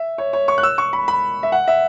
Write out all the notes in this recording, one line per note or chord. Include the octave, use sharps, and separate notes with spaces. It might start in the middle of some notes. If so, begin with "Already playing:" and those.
Already playing: E5
C#5
C#5
C#6
F#6
E6
C#6
B5
B5
E5
F#5
E5